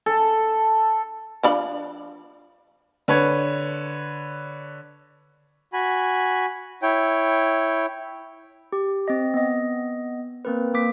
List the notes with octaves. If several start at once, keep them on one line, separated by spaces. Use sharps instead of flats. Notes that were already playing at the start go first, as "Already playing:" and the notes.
A4
F3 D4 B5
D3 B4 C#5
F#4 G#5 B5
E4 C#5 G5
G4
C4 D#5
B3 D#5
A#3 C4 A#4 B4
A#3 D6 B6